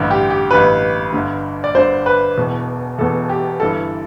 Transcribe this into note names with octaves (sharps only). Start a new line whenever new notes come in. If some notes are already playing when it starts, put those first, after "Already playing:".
Already playing: A1 G2 D3
G4
G4
A1 G2 D3 B4
G1 G2 D3
D5
G1 G2 D3 C5
B4
E1 E2 B2
E1 E2 B2 A4
G4
G1 G2 E3 A4